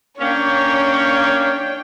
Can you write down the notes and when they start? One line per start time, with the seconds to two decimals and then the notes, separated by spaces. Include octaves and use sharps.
0.20 A#3 C#4 D4 C#5 G5